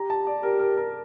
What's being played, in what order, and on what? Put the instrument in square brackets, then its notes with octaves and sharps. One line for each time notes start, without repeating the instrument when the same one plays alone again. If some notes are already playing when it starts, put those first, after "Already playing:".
Already playing: [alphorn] G4 [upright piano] A#5
[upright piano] A5
D5
[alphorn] G4 [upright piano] A#4
[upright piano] A#4
A#4